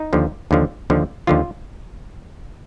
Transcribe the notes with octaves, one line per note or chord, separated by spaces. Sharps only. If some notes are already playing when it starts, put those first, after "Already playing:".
Already playing: D#4
D#2 D3 F3
D#2 D3 F3
D#2 D3 F3
D#2 D3 F3 F4